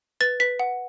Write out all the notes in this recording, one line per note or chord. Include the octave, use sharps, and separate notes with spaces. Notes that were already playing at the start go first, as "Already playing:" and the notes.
B4 A6
B4 B6
F#5